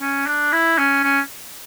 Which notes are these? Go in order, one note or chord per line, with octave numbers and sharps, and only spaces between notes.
C#4
D4
E4
C#4
C#4